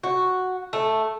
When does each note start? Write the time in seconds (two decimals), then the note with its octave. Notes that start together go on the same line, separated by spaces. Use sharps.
0.04 F#4
0.73 A3